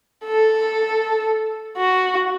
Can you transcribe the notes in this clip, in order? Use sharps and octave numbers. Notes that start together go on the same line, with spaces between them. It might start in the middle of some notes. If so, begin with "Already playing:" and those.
A4
F#4